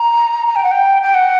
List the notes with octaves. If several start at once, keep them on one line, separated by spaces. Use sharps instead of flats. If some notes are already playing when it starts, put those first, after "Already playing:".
Already playing: A#5
A#5
G5
F#5
G5
G5
F#5